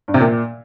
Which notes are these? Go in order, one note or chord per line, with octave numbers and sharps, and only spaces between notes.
G2
C3
A#2